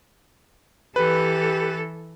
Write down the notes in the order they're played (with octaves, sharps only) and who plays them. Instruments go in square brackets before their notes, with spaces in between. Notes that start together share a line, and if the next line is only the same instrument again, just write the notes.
[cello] E3 A4 [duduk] G4 [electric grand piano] B4